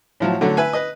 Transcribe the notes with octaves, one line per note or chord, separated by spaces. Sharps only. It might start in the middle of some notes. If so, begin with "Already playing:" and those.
A2 F3 F#3
D3 F#3 A3
B4 E5 G#5
B4 D#5